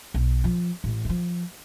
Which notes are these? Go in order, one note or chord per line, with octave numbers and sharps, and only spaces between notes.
B1
F3
A1
E3 F3